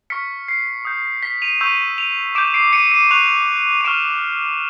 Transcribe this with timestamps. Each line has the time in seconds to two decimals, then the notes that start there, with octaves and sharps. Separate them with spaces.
0.10 C#6 F6 B6 C#7
0.48 C7
0.85 D#6 G6
1.23 B6
1.42 D#7 F7
1.61 C#6 E6 G6 D#7 F7
1.98 D#7 F7
2.35 D6 G6 D7 E7
2.54 C7 D7
2.73 C#7 D#7
2.92 C#7 D#7
3.11 C#6 F#6 D#7 F7
3.81 D#7
3.85 C#6 F6 D7 E7